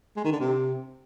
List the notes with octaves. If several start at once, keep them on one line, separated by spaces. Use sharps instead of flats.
G#3
D#3
D3
C3